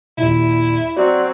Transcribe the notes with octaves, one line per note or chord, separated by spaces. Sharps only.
D#2 A#2 E4
F#3 C4 F#4 D5